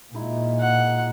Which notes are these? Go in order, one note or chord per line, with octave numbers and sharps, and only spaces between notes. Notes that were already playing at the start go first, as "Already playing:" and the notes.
A#2 G#3 D#4 E4
F#5